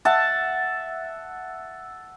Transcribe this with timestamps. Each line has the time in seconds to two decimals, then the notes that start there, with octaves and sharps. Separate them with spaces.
0.05 E5 F#5 A5